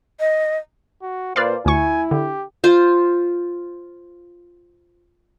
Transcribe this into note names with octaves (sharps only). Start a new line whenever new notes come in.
D#5
F#4
A#2 B4 C5 D5 F5
D2 E4 G#5 C#6
D3 G4
F4 C5